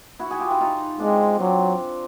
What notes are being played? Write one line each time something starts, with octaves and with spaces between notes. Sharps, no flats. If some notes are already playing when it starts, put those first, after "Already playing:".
E4 F#4
F#4 G#4
F4 G4
E4 F#4
D#4 F4
G#3 C4 D4
F#3 C4 D4